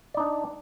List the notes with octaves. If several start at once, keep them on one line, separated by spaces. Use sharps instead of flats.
D4 D#4 D5